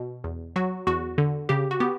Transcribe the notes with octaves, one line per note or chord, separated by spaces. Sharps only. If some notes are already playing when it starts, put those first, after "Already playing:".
Already playing: B2
E2
F#3 F#4
E2 F#4
D3
C#3 G4
F#4
B3 G4